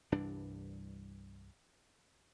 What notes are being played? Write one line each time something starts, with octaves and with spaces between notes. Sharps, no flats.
C2 G2 E3 D4